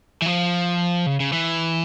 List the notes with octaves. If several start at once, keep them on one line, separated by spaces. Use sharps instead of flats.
E3
F3
C#3
C#3
E3